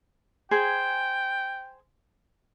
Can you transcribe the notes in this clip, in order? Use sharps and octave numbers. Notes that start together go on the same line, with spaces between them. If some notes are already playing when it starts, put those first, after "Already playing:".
G#4 C5 G5 G#5